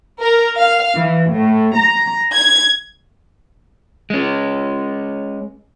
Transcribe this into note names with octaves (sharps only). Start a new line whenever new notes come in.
A#4
F5
E3
A2
A#5
G#6
G#3 C#4